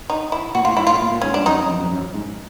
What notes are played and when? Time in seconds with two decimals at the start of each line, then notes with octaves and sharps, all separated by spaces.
0.10 D#4
0.32 E4
0.55 A#2 F#4
0.65 A2 F4
0.77 G#2 E4
0.87 A2 F4
1.00 A#2
1.12 A#2
1.22 G#2 C#4
1.34 G2 D4
1.46 F#2 D#4
1.57 F#2
1.69 F2
1.80 F2
1.91 F#2
2.14 G#2